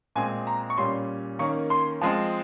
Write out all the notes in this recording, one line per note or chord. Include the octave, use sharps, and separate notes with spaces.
A#2 G#3 C4 G#5
A#5
C#6
A#2 G3 C#4 C6
D#3 A#3 C#4 C#6
C6
F3 G#3 C4